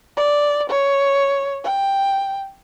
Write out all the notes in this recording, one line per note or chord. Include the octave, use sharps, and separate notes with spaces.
D5
C#5
G5